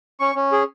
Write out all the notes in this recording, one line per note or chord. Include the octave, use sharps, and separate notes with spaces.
C#4 C#6
C#4
G#4